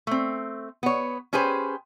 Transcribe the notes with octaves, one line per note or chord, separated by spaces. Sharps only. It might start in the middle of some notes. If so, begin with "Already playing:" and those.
A3 C4
B3 C#5
C#4 G4 G#4 B4 C5